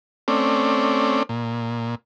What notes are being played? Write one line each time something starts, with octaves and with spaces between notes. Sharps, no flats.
A3 C4 C#4 D5
A#2